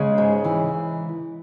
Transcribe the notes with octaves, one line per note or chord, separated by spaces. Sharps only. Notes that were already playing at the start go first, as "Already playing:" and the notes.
Already playing: C#3 G#3
G#2
E3